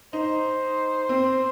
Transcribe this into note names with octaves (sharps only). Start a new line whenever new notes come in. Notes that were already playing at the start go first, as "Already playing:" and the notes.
D#4 C5
C4